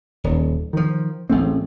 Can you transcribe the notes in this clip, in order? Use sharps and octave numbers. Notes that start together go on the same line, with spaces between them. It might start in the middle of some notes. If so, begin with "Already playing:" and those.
D#1
D#3 F3
A1 G#3 A3 C4